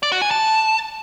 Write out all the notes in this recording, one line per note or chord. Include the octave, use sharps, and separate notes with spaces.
D5
F#4
G#5
A5